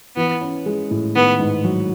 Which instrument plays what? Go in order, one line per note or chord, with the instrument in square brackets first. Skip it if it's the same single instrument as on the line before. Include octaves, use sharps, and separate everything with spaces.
[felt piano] E3 [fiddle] B3
[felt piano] C#4
G#3
A2
[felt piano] D#3 [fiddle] B3
[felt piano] G#2
F#3